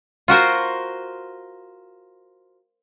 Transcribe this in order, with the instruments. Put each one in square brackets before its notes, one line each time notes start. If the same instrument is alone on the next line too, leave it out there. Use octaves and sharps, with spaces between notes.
[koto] F4 F#4 A#4 C5